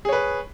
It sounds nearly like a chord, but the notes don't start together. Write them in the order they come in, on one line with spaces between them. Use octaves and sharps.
G#4 C#5 B4